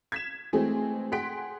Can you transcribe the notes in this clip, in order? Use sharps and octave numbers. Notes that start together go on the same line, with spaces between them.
G#6 B6 E7
E3 G#3 A3 C4 G#4
G#4 F#5 G5 C6 B6 D7